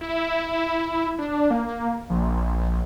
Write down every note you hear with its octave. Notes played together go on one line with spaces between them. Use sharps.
E4
D4
A#3
A#1